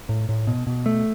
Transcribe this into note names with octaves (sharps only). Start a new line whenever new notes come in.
A2
A2
B2
B2
A3